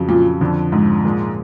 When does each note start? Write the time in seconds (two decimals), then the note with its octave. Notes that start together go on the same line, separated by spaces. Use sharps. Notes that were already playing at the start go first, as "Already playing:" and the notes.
Already playing: F2 C#3 F#3
0.09 A#2
0.41 F2 D3 F3
0.72 G#2
1.05 A#2 F3 G#3